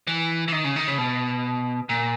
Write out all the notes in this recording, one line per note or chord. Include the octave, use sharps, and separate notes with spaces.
E3
E3
D#3
C#3
D#3
C#3
B2
A#2